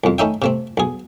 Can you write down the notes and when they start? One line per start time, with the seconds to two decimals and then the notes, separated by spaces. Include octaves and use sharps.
0.04 C2 F2
0.18 A3 C#4 D#4 E5 G5
0.42 C3 A3 C4
0.77 B1 G#4